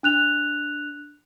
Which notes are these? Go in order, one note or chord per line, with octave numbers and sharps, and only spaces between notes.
D4 F#6 F7